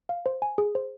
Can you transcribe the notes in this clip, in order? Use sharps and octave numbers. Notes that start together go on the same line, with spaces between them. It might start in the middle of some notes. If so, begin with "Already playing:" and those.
F5
C5
G#5
G#4
C5